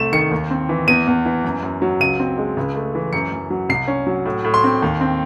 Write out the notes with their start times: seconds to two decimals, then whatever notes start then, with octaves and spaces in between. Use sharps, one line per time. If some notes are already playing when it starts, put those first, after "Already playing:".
Already playing: C2 A3 C4 E7
0.12 D#3 C#7
0.31 D#2
0.51 C4
0.69 E3
0.87 E2 D#7
1.07 E2
1.25 E3
1.44 F#2
1.63 F#2
1.82 F#3
2.00 C#2 D#7
2.20 C4
2.38 G#3
2.57 C#2
2.75 A3
2.95 E3
3.13 F#2 C#7
3.32 F#2
3.50 F#3
3.69 C2 C7
3.88 C#4
4.07 F#3
4.25 A2
4.44 A2
4.54 C6
4.64 C4
4.82 D#2
5.01 C4